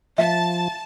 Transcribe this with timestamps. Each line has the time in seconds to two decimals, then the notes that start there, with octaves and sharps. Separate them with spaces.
0.18 F3 E5 F5 A5